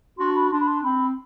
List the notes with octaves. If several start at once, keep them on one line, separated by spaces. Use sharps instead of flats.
D4 F#4 C6
B5
D4 C6
B5
C6
C4 B5